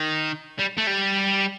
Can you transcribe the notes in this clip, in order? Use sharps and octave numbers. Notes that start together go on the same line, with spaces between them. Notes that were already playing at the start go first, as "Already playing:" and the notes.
Already playing: D#3
G3
A3
G3